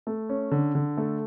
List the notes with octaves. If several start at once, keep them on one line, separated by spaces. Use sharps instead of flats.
A3
C#4
D3
D3
A3